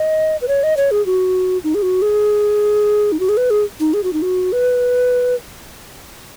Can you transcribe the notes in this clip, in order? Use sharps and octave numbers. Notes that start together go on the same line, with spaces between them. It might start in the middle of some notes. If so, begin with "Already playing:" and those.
Already playing: D#5
B4
C#5
D#5
C#5
G#4
F#4
D#4
G#4
F#4
G#4
D#4
F#4
G#4
B4
G#4
D#4
G#4
F#4
D#4
F#4
B4